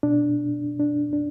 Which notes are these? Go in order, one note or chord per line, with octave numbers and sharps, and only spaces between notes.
B2 D4
D4
D4